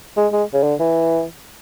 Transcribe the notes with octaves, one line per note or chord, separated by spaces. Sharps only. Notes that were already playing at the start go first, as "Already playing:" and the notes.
G#3
G#3
C#3
D3
E3